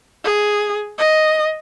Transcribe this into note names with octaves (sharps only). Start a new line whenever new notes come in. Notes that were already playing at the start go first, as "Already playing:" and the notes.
G#4
D#5